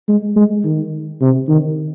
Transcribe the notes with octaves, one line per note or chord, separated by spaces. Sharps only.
G#3
G#3
D#3
C3
D#3